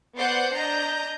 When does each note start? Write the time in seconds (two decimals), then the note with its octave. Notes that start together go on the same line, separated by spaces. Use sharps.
0.17 B3 C5 D5 F#5 G6 C7
0.54 D4 D#5 A#5 G6